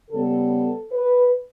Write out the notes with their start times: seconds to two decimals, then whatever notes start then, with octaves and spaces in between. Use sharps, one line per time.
0.10 C#3 G3 B3 A4
0.91 B4